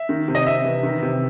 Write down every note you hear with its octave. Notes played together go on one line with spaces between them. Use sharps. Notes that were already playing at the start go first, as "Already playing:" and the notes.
Already playing: E5
D#3
C3
D#5
C3 E5
E3
D#3
C3